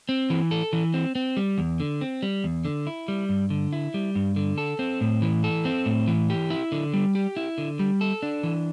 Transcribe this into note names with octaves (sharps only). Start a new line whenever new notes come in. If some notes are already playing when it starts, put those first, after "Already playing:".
C4
E3
A4
E3
C4
C4
G3
E2
D3
C4
G3
E2
D3
E4
G3
G2
D3
E4
G3
G2
D3
A4
C4
A2
E3
A4
C4
A2
E3
G4
E4
D3
G3
G4
E4
D3
G3
A4
D4
E3